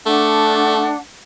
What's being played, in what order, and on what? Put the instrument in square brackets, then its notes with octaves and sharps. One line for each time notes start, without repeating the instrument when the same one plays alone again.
[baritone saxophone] A3 [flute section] D4 F#5